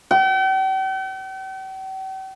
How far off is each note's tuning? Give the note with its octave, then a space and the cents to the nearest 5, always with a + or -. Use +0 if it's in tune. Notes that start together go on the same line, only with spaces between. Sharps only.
G5 -45